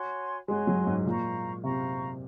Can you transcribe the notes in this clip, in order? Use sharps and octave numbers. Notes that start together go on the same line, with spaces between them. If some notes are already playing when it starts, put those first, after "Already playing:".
Already playing: F#4 C#5 G#5 C6
G#3 F#4 C#5 G#5 C6
F#3
G#2
A#2 C5 F5 A#5 C#6
C3 C5 F5 A#5 C#6